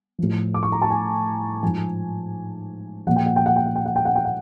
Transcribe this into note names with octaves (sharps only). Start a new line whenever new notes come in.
A2 F3
D6
C#6
A#5
A5
G#5
G#2 F3 G#5
A#2 F3 F#5
G5
F#5
G5
F#5
G5
F#5
G5
F#5
G5
F#5
G5
F#5